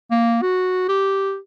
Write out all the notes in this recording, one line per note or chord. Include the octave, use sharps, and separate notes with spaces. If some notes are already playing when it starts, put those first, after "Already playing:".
A#3
F#4
G4